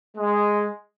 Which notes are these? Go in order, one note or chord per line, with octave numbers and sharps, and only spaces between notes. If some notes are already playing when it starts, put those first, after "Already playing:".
G#3